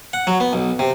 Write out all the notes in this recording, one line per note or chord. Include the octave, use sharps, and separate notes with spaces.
F#5
F#3
B3
B1
C3